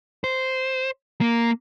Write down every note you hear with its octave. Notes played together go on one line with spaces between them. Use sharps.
C5
A#3